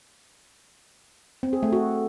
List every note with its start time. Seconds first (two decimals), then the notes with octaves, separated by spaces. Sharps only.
1.43 C4
1.53 G#4
1.63 A3
1.72 F#4